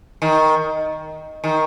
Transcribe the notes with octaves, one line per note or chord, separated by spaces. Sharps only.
D#3
D#3